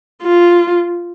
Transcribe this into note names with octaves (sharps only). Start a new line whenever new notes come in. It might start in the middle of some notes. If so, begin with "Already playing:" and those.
F4